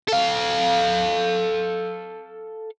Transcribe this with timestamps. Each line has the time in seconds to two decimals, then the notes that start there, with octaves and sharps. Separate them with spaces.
0.08 A4 F5